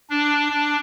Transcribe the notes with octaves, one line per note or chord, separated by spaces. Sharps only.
D4
D4